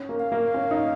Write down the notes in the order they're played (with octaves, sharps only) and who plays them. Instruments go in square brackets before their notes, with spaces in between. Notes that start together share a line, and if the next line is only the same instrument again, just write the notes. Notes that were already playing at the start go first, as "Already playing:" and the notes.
Already playing: [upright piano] C#4
A#3
[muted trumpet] F5
[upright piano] A#3
C#4
D#4